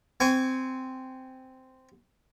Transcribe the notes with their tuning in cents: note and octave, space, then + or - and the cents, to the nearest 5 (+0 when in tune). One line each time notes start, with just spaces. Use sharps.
C4 -10 G#5 -5 C#6 +25